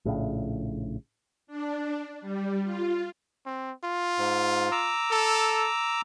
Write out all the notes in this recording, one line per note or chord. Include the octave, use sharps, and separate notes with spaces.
A#1 A2 C#3
D4
G3
F4
C4
F4
G#2
A#5 D6 E6
A4